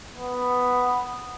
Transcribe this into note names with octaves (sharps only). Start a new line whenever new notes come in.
B3